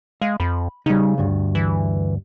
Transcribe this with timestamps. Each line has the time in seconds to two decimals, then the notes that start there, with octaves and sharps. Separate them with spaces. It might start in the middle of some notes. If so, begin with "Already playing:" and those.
0.22 G#3 F5
0.40 F2 B5
0.86 C#3 G3 D#4
1.18 D2 G2
1.55 E3